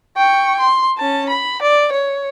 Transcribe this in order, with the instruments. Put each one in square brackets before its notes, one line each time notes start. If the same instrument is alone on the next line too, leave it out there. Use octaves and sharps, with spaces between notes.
[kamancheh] G5 C#6
C6
C#4 A5
B5
D5
C#5